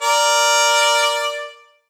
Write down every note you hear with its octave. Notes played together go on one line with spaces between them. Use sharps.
A#4 D5